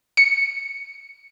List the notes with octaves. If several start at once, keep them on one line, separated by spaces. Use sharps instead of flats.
C#7